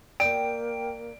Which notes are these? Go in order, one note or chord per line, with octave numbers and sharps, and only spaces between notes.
A#3 D5 G5 D7